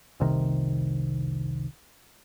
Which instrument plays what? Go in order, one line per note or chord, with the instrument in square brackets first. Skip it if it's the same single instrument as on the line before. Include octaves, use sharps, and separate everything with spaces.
[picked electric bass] F1 C2 C3 D#3